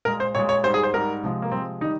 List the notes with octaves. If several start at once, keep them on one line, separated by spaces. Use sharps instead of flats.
A#2 G#3 A#4
C5
A#2 G#3 C#5
C#5
G#2 G3 C5
G#4
C5
G#2 G3 A#4
C3 F3 G#3
A#3
C3 F3 G#3 C4
D#3 G3 D#4